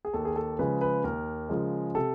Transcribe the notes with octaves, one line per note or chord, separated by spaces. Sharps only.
G#4
D#2 A4
G#4
A4
C#3 F3 G#3 B4
B4
D#2 A#4
C#3 F3 G#3
C3 A4